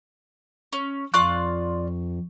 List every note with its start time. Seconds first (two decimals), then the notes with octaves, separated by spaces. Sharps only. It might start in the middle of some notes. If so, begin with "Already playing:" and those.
0.73 C#4
1.14 F2 F4 D5 C#6 F#6